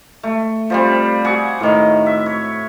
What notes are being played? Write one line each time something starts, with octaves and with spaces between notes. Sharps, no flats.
A3
F3 G3 C4
F#4 G#4 F#5 D6
A2 D#3
E5
C#5